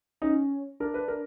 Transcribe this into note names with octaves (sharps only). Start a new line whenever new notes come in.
C#4 D#4
D4 A#4
B4
A#4